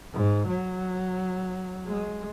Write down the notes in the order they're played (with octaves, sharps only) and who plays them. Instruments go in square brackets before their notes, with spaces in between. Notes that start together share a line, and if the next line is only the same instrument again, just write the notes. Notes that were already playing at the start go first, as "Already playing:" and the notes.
[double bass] G#2
F#3
G#3